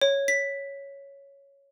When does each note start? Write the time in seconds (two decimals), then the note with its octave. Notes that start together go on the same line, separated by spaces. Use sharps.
0.01 C#5
0.28 B6